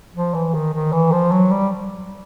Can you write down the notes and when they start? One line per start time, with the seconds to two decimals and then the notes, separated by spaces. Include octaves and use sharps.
0.15 F3
0.34 E3
0.54 D#3
0.74 D#3
0.92 E3
1.12 F3
1.32 F#3
1.51 G3